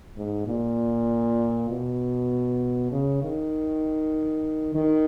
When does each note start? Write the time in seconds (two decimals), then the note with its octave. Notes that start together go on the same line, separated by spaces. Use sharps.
0.17 G#2
0.47 A#2
1.69 B2
2.92 C#3
3.23 D#3
4.75 D#3